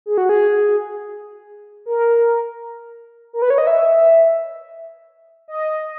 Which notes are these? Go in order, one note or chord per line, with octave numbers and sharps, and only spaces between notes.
G#4
F#4
G#4
A#4
A#4
B4
C#5
D#5
E5
D#5